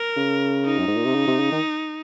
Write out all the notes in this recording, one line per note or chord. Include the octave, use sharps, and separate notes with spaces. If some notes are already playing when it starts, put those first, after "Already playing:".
Already playing: A#4
C#3
D#4
F#2
G#2
A#2
C3
C#3
C3
C#3
D#3